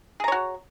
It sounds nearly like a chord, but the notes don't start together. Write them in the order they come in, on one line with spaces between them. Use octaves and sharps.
G#4 A#5 C#5 F#4